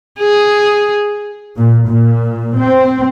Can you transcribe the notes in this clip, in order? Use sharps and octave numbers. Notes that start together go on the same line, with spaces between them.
G#4
A#2
A#2
C4